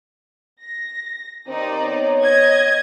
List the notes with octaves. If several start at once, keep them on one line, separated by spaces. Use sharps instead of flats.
A#6
D#2 C4 D#4 C5 D5
B3 C#5
D#5 G#6